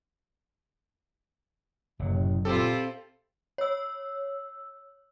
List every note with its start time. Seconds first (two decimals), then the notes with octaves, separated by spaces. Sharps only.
1.99 F#1 F#2 A2 C3 F#3
2.45 A#2 C4 E4 F4 G4 A4
3.58 C#5 E6